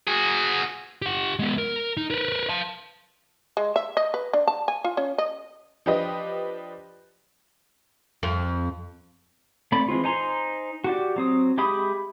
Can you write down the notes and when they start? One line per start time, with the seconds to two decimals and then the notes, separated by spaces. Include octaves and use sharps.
0.07 F#4 G#4
1.02 G4 F#5
1.39 G#3 B3
1.58 A#4
1.97 D#4
2.10 A#4 B4
2.49 F5 A5
3.57 G#3
3.76 E5
3.97 D#5
4.14 B4
4.33 D4
4.47 A5
4.68 G#5
4.84 F4
4.97 C#4
5.18 D#5
5.86 F3 D4 G4 B4 D#5
8.23 F2
9.72 A3 C4 D5 B5
9.88 E3 G#3 C4 F4
10.04 D#4 C5 G#5 A#5 C6
10.84 F#4 G4 D5
11.16 F#3 C4 D#6
11.58 G#3 G4 E5 B5 D#6